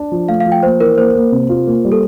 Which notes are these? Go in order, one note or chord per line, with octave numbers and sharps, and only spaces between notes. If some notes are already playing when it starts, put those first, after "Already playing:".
Already playing: D4
F3
A3 F5
F5
F3
G5
A#3 C5
E3 A#4
A#3 C5
A#3
C3
F4
A#3
G3
A4